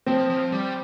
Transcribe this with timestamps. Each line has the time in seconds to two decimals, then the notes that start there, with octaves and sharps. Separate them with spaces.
0.06 F3 C4
0.30 F3
0.52 G3